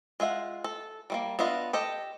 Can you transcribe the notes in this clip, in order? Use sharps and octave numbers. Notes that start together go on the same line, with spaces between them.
G#3 F4 E5 F#5
A4
G3 A3 A#3
B3 D4 F4 D#5 E5
G4 A4 D#5